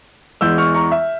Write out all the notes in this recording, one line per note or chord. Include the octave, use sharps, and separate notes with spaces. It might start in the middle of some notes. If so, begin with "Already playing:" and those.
E2 E3 G#3 E6 G6
C#6 F6
A#5 C#6
E5